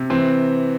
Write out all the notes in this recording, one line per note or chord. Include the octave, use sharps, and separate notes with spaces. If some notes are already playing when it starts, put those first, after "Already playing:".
Already playing: C3
E3 C4